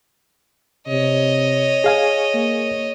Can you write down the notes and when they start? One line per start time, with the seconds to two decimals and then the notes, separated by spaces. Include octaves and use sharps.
0.88 C3 C#5 D#5
1.84 G#4 F5 G#5
2.34 A#3